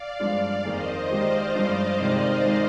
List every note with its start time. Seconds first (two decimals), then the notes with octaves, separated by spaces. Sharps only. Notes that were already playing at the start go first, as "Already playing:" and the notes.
Already playing: D5 F5
0.19 G2 F3 G#3 D4
0.65 F2 D#3 A#3 D#4 G#4 C5 D#5
1.10 D#3 G#3 D#4 G4 D5 F5
1.55 G2 F3 G#3
1.99 C3 D#3 G#3 D#4 G4
2.44 D#3 G#3 D#4 G#4